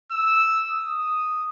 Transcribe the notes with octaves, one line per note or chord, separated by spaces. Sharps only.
E6
D#6